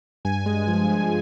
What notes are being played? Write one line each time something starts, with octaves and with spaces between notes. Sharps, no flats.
G2 G#5
G#3
F3
G2